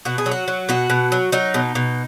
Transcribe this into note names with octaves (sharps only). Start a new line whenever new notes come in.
B2 F#4
G#4
F#3
F#4
F#3
B2 F#4
B2
F#3
F#3 D#4
B2
B2